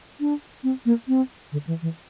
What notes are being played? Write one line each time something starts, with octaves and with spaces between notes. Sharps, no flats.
D4
C4
A#3
C4
D3
E3
E3